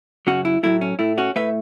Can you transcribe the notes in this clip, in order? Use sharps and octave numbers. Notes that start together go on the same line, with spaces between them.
F#2 C#3 F#3 C#4 F#4
E4
A2 F#3 A3 E4
C#4
A2 A3 E4
C#4 F#4
A2 A3 B4 E5